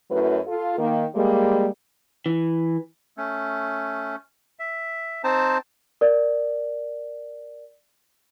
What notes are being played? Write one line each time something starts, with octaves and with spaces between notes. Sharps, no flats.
F#2 F#3 A3 E4 B4
F4 A4
D#3 A#3
G3 G#3 A#3
E3
A3 C#4
E5
C4 D#4 C5 A5
A#4 D5